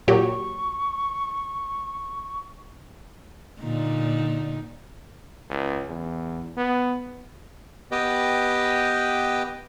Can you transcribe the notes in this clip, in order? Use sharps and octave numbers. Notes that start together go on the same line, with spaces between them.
A#2 F#3 G4 C#6
A#2 D3 D#4
C#2
E2
B3
B3 G4 B4 D#5 G5